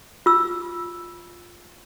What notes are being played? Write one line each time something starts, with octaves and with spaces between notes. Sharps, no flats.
F4 E6